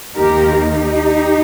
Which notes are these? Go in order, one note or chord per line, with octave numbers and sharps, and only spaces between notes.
D#2 D#3 A#3 D#4 G4 A#4
D#4 G4